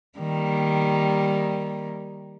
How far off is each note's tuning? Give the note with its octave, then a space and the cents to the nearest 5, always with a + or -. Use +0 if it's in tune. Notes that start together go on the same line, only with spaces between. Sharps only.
D#3 +0 G3 +0 A#3 +0